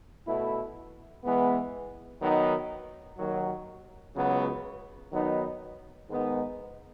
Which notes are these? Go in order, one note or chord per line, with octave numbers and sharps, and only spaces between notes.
B2 A3 E4
E3 G#3 B3
D#3 F#3 B3 D#4
D#2 D#3 F#3
C#2 C#3 F#3 B3 F#4
D#3 F#3 B3 D#4
G#2 D#3 G#3 B3 D#4